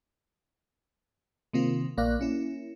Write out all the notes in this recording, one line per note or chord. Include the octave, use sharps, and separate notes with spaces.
C3 D#3 A#3 C4 F4
A#1 A#3 D5 F5 F#6
A#3 C#4 E4